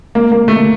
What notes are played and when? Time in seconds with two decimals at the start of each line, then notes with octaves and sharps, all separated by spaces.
0.15 A#3
0.32 A#3
0.48 A3